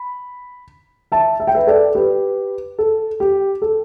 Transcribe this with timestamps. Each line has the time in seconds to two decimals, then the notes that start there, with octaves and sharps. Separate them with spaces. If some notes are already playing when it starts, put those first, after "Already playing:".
Already playing: B5
1.12 E5 A5
1.40 E5
1.47 G5
1.54 B4 E5
1.67 A4 D5
1.95 G4 B4
2.79 A4
3.20 G4
3.62 A4